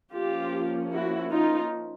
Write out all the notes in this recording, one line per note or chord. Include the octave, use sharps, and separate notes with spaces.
F3 A#3 C#4 F4 G4
E4 F#4
D#4 F4